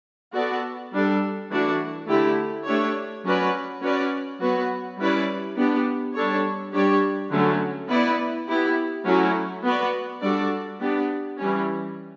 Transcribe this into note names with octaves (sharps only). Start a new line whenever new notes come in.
B3 F#4 A4 D5
G3 D4 A4
E3 A3 D4 F#4
D3 A3 E4 G4
A3 D4 G4 C#5
F#3 C#4 F#4 B4 D5
C#4 F#4 B4 D5
F#3 B3 F#4 B4
G3 C#4 E4 B4 D5
B3 D4 G4
G3 D4 A4 C#5
G3 D4 G4 C#5
D3 F#3 A3 C#4
B3 E4 B4 D5
B3 E4 G4
F#3 A3 C#4 E4
B3 F#4 B4 D5
G3 D4 F#4 A4 D5
B3 D4 G4
E3 G3 C#4